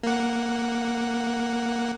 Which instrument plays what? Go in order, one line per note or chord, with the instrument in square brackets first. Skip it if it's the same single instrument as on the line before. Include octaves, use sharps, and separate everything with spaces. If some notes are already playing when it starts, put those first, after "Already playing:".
[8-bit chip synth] A#3 F#5